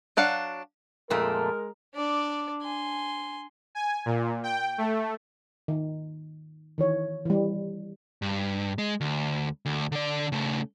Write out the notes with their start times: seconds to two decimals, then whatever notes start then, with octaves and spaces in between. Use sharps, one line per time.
0.17 F#3 D4 F5 F#5
1.10 F2 A#2 G#3 A3 A#4
1.95 D4 D5
2.62 G#5 C6
3.75 G#5
4.06 A#2
4.43 G5
4.78 A3
5.68 D#3
6.78 D#3 E3 C#5
7.26 E3 G3
8.22 G2
8.78 G#3
9.01 D2
9.66 D2
9.92 D3 D5
10.32 C#3 A3